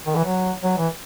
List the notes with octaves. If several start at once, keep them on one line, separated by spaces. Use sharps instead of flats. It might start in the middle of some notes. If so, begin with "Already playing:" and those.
D#3
E3
F#3
F#3
E3